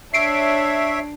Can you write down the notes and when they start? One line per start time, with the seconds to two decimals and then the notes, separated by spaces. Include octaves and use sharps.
0.14 D4 C#5 E5 C7 D7